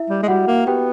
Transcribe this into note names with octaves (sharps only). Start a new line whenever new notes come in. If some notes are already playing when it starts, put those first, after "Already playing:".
Already playing: E4 E5
G3
G#3
G3 F#4 F#5
A#3
B3 G4 G5